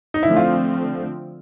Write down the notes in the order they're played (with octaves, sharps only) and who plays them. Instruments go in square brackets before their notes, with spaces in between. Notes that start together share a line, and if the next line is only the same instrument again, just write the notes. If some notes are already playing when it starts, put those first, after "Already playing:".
[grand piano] D#4
[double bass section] D3 F3 A3 C4 [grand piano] E4
[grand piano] F4